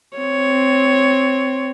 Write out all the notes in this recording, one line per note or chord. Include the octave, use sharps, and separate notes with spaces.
C4 C#5